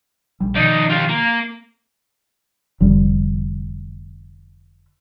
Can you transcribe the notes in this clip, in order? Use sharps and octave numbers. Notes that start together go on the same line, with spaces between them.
A#1 G3
B2 D#3 F3 D#4 D5
F4 G4
A#3
F1 D3 G3